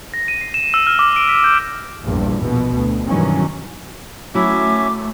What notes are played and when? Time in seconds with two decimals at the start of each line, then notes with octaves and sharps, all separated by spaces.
0.14 A#6
0.28 D#7
0.41 C7
0.54 E7
0.74 E6
0.87 F6
0.99 D6
1.16 D7
1.29 B6
1.44 G6
2.02 A#1 E2 G2
2.42 A#1 B2
2.76 D2
3.06 G2 B2 D#3 E3 F#3 C#4
4.35 F#3 A3 C#4 E4 E5 D6